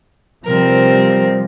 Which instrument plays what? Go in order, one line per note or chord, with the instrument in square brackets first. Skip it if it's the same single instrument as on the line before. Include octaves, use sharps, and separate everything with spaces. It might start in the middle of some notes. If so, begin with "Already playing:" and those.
[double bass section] C3 F3 G3 [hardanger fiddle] C4 A#4